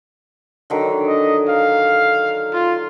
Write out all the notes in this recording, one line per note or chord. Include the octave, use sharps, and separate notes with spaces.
D3 D#3 F#3
D#5
F5
F4